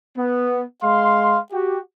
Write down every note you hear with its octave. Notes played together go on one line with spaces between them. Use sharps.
B3
G#3 F5 C6
F#4 G4